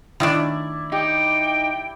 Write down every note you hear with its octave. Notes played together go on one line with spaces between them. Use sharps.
D#3 A3 D4 E4 D5
D#4 G4 G5